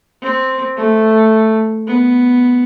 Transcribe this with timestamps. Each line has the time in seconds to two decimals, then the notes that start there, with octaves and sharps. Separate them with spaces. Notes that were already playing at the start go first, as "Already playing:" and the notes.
0.22 C4
0.76 A3
1.87 B3